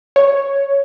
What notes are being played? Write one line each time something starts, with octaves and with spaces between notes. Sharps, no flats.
C#5